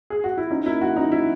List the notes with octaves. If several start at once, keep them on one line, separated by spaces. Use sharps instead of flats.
G#4
F#4
E4
C#4 D#4
A#3 E4
F#3 F#4
C#4 D#4
F#3 E4